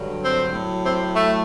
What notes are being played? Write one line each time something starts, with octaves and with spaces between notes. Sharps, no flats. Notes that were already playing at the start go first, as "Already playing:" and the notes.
Already playing: G2 D3 F#3
C4
A2 F#3
C4
A3